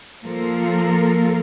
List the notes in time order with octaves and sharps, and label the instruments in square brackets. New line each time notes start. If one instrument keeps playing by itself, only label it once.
[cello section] F3 A#3 A4 A#4